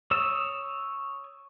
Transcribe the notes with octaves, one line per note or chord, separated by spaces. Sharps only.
C#5 D#6 E6